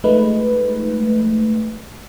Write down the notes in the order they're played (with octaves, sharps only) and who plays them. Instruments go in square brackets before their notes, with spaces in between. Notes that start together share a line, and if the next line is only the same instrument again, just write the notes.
[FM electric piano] F3 G#3 A3 D#4 B4